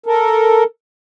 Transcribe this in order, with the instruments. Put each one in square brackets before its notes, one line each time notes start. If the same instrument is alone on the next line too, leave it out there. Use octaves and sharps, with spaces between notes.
[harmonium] A4 A#4